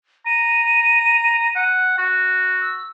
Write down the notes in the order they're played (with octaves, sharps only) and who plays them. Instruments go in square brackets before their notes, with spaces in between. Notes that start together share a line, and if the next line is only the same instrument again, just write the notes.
[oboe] A#5 [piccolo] D#7
[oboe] F#5
F#4
[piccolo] E6